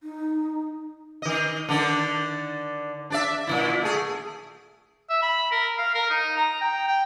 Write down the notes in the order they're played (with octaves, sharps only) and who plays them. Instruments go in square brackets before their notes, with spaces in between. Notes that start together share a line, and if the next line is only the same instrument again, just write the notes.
[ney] D#4
[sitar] D#3 D#5
D3 D#3 D4
D4 D5 E5
A#2 D#3 E4
A3 G#4
[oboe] E5
B5
A#4
F5
A#4
D#4
A#5
G5
G5